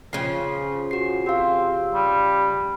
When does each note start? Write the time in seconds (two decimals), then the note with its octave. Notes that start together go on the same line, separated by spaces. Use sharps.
0.13 C#3 F3 C7
0.91 F#4 C7
1.26 C4 G4 F5
1.93 G3